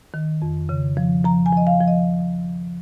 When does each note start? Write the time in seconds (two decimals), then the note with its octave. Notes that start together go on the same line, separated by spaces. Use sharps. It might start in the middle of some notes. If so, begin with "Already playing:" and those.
0.14 D#3
0.42 F2
0.69 C#3
0.97 F3
1.25 F3 A#5
1.46 G#5
1.53 F3 D#5
1.67 F5
1.81 F3
1.88 D#5